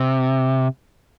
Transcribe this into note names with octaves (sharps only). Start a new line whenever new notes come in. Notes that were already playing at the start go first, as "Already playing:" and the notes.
Already playing: C3